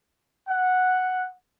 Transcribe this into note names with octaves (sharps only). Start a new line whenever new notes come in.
F#5